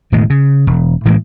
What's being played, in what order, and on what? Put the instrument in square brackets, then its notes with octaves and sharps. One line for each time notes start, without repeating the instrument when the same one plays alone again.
[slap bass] E1 A2 D#3 G#3
C#3
E1
A2 E3 G#3 A#3